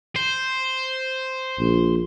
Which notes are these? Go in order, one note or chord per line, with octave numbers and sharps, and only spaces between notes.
C5
A#1